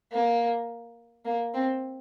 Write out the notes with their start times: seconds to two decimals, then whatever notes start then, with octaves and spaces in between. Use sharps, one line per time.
0.12 A#3
1.25 A#3
1.54 C4